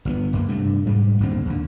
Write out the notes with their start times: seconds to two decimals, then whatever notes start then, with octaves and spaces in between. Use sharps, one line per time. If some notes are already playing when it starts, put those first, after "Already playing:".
0.05 G1 C#3 B3
0.33 G1 F#2 A#3
0.48 G2 C3 A3
0.85 G#2 G3 G#3
1.20 G1 D#2 A2 C4
1.46 D#2 D3